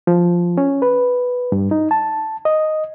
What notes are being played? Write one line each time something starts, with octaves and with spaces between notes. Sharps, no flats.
F3
C#4
B4
G2
D#4
A5
D#5